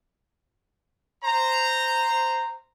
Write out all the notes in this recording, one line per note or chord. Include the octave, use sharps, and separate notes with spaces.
C5 A#5